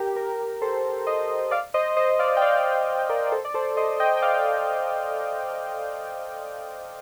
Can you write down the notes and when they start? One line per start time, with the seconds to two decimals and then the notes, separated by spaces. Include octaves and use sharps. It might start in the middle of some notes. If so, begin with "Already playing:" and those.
Already playing: G4 A#4
0.16 G4 A#4
0.62 A4 C5
1.07 C5 D#5
1.51 D5 F5
1.74 C5 D#5
1.97 C5 D#5
2.19 D5 F5
2.37 G5
2.42 D5 F5
2.64 D5 F5
3.09 A#4 D5
3.26 D5
3.32 A4 C5
3.45 D5
3.54 A4 C5
3.77 C5 D#5
4.00 D#5 G5
4.17 G5
4.22 D5 F5